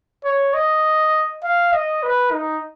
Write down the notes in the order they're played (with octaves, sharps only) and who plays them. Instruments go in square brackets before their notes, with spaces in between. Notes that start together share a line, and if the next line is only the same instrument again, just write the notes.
[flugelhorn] C#5
D#5
F5
D#5
B4
D#4